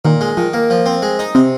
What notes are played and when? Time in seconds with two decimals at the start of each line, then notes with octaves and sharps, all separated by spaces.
0.05 A#2 D#3
0.21 G#3
0.37 D#3 F3
0.53 A#3
0.70 F3
0.86 C4
1.02 G#3
1.19 D#4
1.35 C3 C4